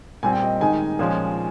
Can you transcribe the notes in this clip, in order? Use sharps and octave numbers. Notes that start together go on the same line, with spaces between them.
A#2 G3 C4 G#5
G5
D#5
D#3 G#3 D#4 G#5
A#2 F3 G#3 C#4